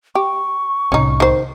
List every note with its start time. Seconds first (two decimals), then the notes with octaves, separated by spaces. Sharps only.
0.15 G4 C#6
0.92 C2 A2 C#4 D#4
1.20 D#3 C5